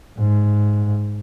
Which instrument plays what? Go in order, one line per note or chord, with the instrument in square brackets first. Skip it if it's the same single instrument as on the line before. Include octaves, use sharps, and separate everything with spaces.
[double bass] G#2